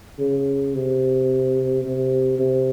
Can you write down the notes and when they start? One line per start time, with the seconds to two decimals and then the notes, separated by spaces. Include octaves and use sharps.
0.19 C#3
0.74 C3
1.85 C3
2.39 C3